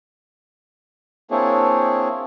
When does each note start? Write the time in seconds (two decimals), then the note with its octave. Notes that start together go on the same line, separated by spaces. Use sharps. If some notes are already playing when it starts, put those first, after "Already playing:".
1.31 A#3 C4 D4 E4 G#4 C#5